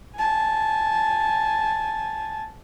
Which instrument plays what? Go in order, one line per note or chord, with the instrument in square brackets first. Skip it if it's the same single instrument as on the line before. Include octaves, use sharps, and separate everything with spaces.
[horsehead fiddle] G#5 A5